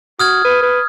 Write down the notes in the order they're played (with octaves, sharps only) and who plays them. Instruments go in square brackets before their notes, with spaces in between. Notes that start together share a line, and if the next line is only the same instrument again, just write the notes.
[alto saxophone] F#4 [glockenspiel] D#6 F6 G#6
[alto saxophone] B4
B4